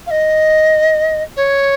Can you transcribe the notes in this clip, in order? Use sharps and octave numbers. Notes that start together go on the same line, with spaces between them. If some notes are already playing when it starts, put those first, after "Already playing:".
F5
D#5
C#5